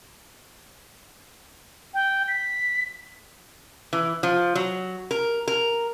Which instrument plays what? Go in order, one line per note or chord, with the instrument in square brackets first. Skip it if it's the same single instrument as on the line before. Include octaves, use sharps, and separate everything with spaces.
[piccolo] G5
B6
[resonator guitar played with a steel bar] E3
F3
F#3
A#4
A#4